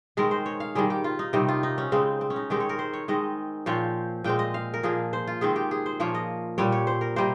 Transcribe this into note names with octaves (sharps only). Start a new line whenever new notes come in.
D#3 G#3 C4 A#4
C5
C#5
F5
D#3 G3 C4 G#4
G4
F4
D#4
C3 D#3 G3 C4
F4
D#4
C#4
C#3 G#3 C4
C4
C#4
D#4
D#3 G#3 C4 G4
C#5
A#4
C5
C#5
D#3 G#3 C4 D#5
A#2 F3 C4 C#5
A#2 G#3 C4 G5
D#5
F5
A#4
A#2 F3 A#3 G#4
C5
F4
D#3 G#3 C4 G#4
G4
G#4
C5
A#2 F3 A#3 C#5
D#5
A#2 G3 C4 C#5
C#5
C5
A#4
C3 G3 A#3 C5